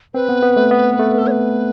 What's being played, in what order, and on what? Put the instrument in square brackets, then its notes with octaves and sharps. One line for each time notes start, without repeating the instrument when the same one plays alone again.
[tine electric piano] C4 [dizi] B4
[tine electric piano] B3
B3
A3
B3
A3
[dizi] A4
C#5
B4